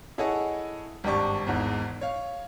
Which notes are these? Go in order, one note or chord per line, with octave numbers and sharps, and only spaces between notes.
E4 G#4 A4 C#5 D#5 F#5
G#1 G2 G4 D5 C#6
G#1 E2 G#2
C#5 F5